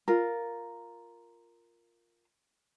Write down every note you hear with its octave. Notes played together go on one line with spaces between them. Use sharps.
F4 A#4